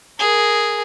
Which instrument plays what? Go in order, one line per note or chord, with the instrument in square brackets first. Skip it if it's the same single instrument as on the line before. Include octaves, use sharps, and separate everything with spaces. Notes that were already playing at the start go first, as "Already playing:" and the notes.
[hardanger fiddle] G#4 A#4